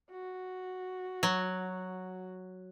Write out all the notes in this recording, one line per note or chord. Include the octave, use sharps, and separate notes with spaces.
F#4
F#3